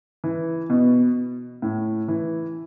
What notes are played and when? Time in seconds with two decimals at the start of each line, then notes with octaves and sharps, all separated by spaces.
0.24 E3
0.70 B2
1.62 A2
2.08 E3